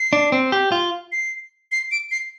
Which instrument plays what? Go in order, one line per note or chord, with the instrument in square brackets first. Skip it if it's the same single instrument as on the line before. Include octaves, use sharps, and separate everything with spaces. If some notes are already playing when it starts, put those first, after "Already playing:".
Already playing: [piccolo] C7
[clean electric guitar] D4
C4
G4
F4
[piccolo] C7
C7
D7
C7